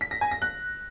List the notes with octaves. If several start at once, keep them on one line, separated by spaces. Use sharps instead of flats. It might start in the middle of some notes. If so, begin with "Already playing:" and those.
B6
A#6
G#5
A#6
F#6